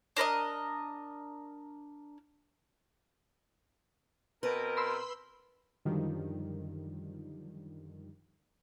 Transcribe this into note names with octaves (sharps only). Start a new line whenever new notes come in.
D4 A#4 B4 D#5
B2 C4 A#4 B4
B5 C6 E6
F#2 D3 D#3 F3 G3